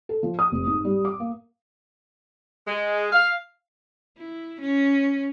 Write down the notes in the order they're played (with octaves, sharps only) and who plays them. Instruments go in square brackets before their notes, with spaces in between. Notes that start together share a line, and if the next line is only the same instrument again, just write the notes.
[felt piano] A4
F3
D#6
F1
G#2
G3
D6
A#3
[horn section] G#3
F5
[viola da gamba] E4
C#4